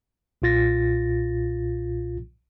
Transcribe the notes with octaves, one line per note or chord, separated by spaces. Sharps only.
B1 A#2 F4 A6 A#6